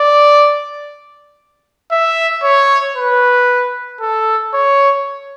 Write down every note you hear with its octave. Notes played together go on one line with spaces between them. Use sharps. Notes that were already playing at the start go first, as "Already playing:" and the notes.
Already playing: D5
E5
C#5
B4
A4
C#5